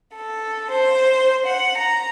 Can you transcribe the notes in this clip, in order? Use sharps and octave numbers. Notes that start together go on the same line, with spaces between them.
A4
C5
F#5
A#5